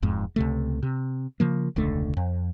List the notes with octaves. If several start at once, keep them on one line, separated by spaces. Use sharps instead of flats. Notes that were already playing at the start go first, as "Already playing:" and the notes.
E1 F2 G#2
C#2 C3 A3
C3
C#3 F3 A#3
E1 C#2 D3 A3
F2